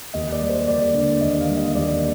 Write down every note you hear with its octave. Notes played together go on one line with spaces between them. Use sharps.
D#2 D#5
D5
G3
C5
D#2 D5
D3
D#2 D#5
F5
G3
D#5
D#2 D5